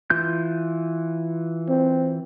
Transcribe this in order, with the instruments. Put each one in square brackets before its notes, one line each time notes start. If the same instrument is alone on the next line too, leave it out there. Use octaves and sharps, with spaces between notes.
[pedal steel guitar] E3 F4 G6
[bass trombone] C4